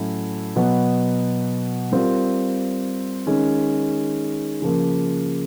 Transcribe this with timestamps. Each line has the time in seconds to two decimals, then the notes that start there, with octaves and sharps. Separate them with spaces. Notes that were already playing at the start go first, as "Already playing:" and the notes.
Already playing: A2 F#3 A3 C#4 E4
0.56 B2 F#3 B3
1.92 G3 C4 F4 A#4
3.27 D#3 G#3 C#4
4.62 C#3 F3 A#3